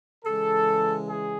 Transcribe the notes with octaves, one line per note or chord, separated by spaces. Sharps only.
C#3 E3 G#3 A4
G#4